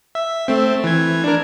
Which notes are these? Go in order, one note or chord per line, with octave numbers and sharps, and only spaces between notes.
E5
A3 C4
E3 G#6
D4 A#4